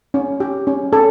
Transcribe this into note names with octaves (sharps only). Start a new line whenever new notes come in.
C#4
G4
C#4
C#4 A4